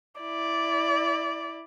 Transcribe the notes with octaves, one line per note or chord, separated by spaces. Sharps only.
E4 D5